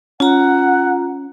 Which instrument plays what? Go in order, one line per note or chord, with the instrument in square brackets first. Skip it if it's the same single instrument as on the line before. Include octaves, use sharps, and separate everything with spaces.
[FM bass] C#4 [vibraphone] F4 A#5 [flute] F#5